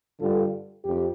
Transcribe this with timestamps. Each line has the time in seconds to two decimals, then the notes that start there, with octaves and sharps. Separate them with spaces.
0.20 G2 D3 G3 F4 A4
0.84 F2 G4